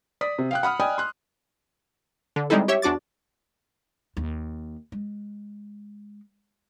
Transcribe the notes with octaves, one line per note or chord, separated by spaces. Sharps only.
D5 D#6 B6
C3
F5 G5 F#6
F#5 B5 D#6 F6
D5 D#5 G5 G#5 B5 D#6
C6 F#6
D3
G3 G#3 C4 D#4 E4 A4
G4 C#5 E5
E2 D4 F#4 D6 A6
D#2
G#3